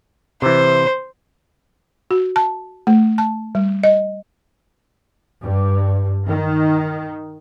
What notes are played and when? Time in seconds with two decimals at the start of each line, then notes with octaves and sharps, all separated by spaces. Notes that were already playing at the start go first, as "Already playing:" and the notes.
0.42 C3 E3 C5
2.11 F#4
2.36 A5
2.87 A3
3.18 A5
3.55 G3
3.84 D#5
5.41 G2
6.27 D#3